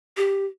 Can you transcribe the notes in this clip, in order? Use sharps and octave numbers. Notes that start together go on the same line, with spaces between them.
G4